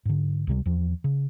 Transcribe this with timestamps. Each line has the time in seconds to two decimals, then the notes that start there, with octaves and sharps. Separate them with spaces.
0.05 G#2 D3
0.47 C#2 C3 G3
0.66 E2 F3
1.04 C#3